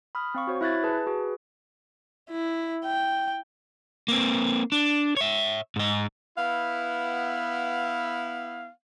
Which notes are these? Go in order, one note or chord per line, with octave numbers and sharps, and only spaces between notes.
B5 D#6 F6
C4 F5 C#6
F#4 C5 C#5
E4 E5 F#6 G#6 A6
G#4 B4 A5
F#4 G#4 B4
E4
G5
A#3 C4
D4
C#5 E5
G#2 D#5
B3 E4 F5